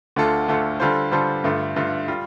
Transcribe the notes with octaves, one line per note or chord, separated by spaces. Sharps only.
D2 D3 A3 F4 A4
D2 D3 A3 F4 A4
D3 G3 F4 A4 C5
D3 G3 F4 A4 C5
G2 D3 A3 F4
G2 D3 A3 F4
G3 F4